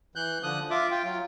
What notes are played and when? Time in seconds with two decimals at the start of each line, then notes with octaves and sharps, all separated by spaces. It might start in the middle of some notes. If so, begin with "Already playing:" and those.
0.16 E3 F#6 G6
0.43 D3 F3 D#6 F#6
0.70 F4 E5 D6
0.91 F4 G5
1.04 F#3 F4